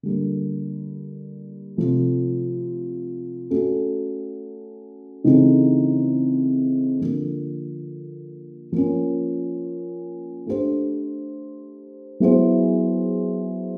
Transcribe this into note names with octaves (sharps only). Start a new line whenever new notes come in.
D3 G3 A#3
C3 F3 A3
A3 C#4 F#4 A4
C#3 E3 A3 C4 D#4
D3 F3 A#3
F3 A#3 C#4
A3 D4 G4 C5
F#3 B3 E4 G#4 C5